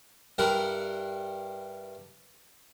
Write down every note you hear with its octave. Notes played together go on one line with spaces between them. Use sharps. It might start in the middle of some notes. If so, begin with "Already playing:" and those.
G2 G3 E4 A#4 F#5 A#5